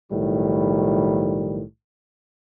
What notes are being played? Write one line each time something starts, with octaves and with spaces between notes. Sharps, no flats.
B1 A2 D#3 F3 G3